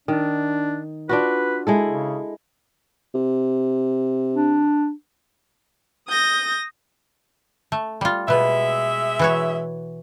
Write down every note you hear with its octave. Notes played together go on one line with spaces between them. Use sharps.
D#3 D4
D4 F4 F#4 B4
G#3 E4 A4
C#3
C3
D4
D#6 G6 A#6
A3
G3 F4
B2 G#3 B3 E5
E3 F#4 C#5